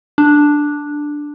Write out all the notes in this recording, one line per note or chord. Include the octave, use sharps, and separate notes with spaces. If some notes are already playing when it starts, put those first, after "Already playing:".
D4